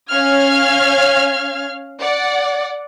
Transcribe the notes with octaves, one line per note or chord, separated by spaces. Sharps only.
C#4 F5 F6 G#6
D5 F#5